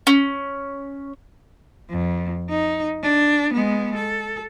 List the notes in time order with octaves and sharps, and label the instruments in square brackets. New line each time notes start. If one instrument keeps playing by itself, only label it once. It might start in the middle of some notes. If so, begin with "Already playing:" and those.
[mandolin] C#4
[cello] F2
D#4
D4
G#3 B3
A4